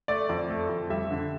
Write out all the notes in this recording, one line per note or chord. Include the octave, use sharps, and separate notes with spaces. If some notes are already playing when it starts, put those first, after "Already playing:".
A3 D5
F2
A3
F2
G3 E5
D3